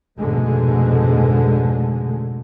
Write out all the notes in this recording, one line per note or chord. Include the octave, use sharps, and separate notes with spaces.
F1 G#2 B2 D3 G#3 A3